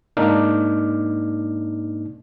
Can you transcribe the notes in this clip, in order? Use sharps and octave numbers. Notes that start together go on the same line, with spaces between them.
G#2 A#3 D4 D#4 D6 F6